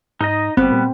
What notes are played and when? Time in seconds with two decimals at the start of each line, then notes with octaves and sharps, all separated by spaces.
0.21 G#2 D#4 D#5
0.57 G1 G3 B3 C4
0.72 A#2